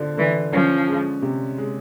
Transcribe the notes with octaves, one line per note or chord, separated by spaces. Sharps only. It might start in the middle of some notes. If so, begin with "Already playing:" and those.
Already playing: D3 F3
D3 E3
F3 C#4
G#3
C3
G#3